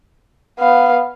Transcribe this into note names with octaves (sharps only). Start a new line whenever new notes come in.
B3 F5